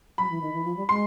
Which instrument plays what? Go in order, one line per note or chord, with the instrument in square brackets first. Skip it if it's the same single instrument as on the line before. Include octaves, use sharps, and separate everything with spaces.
[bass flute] F#3 [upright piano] B5
[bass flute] E3
D#3
E3
F3
G3
[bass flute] G#3 [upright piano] C6